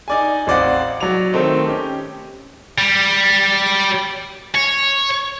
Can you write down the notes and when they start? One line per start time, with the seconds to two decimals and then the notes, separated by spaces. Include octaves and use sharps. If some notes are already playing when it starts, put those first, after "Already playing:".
0.08 D#4 D5 G#5
0.47 A1 C4 D5 D#5 F5 F#5
1.00 F#3 D5 F7
1.33 D#3 A3 C4 D#4
1.67 C#4 G4
2.78 G3
4.55 C#5